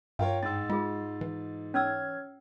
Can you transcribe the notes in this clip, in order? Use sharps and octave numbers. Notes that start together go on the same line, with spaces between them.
G2 F4 A#4 C#5 G5
G#2 D#4 E6 A6
G#3 F4 G#4
E3
C#4 C#5 E6 F6 G#6